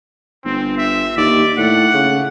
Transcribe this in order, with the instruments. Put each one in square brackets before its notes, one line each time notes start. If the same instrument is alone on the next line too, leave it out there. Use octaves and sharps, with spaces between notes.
[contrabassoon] G1 [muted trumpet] C4
[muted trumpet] E5
[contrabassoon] D#2 [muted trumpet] D5
[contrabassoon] A2 [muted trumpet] F#5
[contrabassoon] C#3